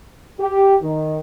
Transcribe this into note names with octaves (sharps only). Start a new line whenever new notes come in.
G4
D#3